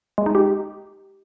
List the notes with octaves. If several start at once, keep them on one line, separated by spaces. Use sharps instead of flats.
G#3
D#4
G4